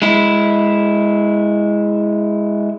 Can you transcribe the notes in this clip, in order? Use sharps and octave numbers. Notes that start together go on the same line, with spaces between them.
G#3 E4